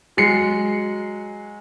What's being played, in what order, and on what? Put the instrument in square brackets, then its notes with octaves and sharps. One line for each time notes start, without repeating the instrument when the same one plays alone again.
[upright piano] F#3 G#3 C7 C#7